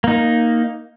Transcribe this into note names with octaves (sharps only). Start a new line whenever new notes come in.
A#3 D#4